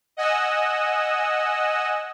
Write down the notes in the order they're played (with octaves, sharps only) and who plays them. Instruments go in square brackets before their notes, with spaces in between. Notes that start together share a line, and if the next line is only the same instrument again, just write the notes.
[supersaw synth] D#5 F#5 G#5 E6